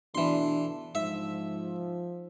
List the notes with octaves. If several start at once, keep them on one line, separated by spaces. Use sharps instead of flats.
B2 E3 A3 D4 C6
G#2 F3 E5